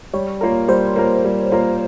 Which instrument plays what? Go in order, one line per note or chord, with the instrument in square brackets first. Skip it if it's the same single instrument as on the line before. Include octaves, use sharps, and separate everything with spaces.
[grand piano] G3 [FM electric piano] C#5
[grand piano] A#3 F4 A#4
[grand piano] G3 [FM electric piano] C5
[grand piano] A#3 F4 A#4
G3
A#3 F4 A#4